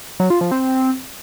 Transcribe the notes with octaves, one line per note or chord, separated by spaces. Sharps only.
F#3
F4
F3
C4